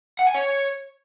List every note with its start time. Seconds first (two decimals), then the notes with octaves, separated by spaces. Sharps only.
0.19 F#5
0.27 G#5
0.34 C#5